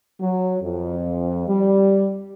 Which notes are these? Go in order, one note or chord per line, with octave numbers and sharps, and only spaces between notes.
F#3
F2
G3